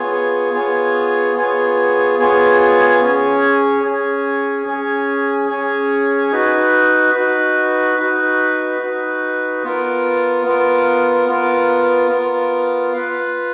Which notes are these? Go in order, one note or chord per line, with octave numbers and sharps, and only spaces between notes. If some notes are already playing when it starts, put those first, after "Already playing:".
Already playing: B3 F4 G#4 C#5
B3 F4 G#4 C#5
B3 F4 G#4 C#5
B3 F4 G#4 C#5
C#4 G#4 C#5
C#4 G#4 C#5
C#4 G#4 C#5
C#4 G#4 C#5
D#4 F#4 B4
D#4 F#4 B4
D#4 F#4 B4
D#4 F#4 B4
B3 F4 A#4
B3 F4 A#4
B3 F4 A#4
B3 F4 A#4
F4 B4 F5